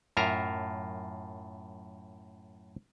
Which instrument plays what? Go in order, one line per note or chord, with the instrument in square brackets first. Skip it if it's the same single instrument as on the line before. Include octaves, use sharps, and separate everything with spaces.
[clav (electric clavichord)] F#2 A2 F4 A#4 E5 A#5